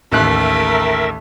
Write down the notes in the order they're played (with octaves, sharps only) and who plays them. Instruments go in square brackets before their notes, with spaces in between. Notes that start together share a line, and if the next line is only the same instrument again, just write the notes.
[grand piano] A1 D#2 F#6 [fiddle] A3 [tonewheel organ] A#4 E5